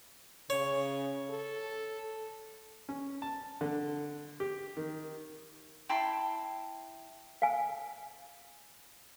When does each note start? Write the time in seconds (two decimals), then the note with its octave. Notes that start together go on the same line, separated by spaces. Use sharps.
0.50 C#3 C#5
1.30 A4
2.89 C#4
3.22 A5
3.61 D3
4.40 G4
4.77 D#3
5.89 E4 G5 A5 C6
7.42 F5 G#5